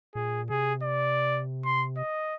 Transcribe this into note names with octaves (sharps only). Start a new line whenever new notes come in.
A#2 G#4
C3 G#4
D5
C6
D#5